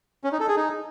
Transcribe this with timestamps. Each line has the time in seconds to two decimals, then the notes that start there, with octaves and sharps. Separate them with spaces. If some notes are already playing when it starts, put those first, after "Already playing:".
0.24 C#4
0.32 D#4
0.40 A4
0.48 G#4
0.56 D#4